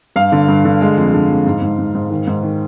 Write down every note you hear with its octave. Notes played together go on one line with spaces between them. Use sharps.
G2 F5
D3
G2
D3
G#3
F2
D3
F2
G#2
G#2
G#2
G#2
D#3
G#2
D#3